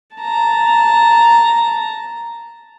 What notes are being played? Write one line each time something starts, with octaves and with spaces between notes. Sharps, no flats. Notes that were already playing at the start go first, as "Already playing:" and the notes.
A5 A#5